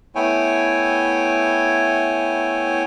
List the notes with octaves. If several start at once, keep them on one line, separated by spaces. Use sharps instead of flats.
A3 B3 E4 C#5 G5 G#5